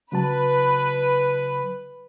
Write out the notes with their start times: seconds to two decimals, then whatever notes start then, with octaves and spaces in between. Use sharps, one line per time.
0.12 C#3 F#3 B4 A5